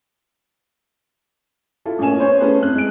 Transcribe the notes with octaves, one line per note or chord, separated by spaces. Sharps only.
E4 F4 A4
A1 A#3 C#4 G#5 E7
B3 C5 C#5
A3 C#4 E4 G#4 A4 B4
F2 F#6
G#3 D7